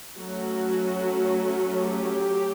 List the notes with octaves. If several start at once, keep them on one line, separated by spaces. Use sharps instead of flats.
F#3 A3 C#4 F#4
G4